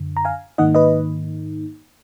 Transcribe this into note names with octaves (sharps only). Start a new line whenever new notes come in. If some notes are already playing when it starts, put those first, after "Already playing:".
Already playing: F#2 D3
A#5
F5 G#5
G#2 D#3 A#3 D#4 D#5 F#5
B4 D#5